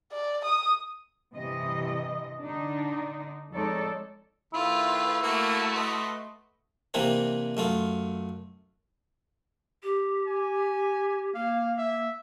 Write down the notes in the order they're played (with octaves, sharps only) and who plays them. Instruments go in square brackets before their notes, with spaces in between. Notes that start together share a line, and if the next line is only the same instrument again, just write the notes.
[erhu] D5
D#6
[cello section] G2 C3 E3 G3 D#5
D3 D4 D#4
F2 G#3 D#4 A4 C#5 D5
[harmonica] D#3 A3 [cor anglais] E4 [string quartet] F4 B4
[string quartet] A3 F#4 [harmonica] A#3
[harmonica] B4 D#5 C6
[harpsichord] C3 E3 A#3 C4 D4
F#2 A3 F4
[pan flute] G4
[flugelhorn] G#5
[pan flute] A#3 [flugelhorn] F5
[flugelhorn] E5